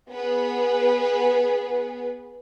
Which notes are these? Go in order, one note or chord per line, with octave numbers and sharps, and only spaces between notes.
B3 G#4 B4